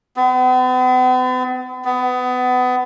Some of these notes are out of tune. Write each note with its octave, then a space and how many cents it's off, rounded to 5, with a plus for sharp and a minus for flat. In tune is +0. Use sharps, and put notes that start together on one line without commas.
B3 +45
B3 +25